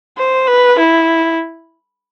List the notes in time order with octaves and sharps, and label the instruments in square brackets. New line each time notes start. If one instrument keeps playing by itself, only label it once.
[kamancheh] C5
B4
E4